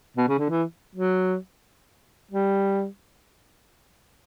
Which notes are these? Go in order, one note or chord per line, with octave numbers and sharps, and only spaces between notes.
B2
C#3
D3
E3
F#3
G3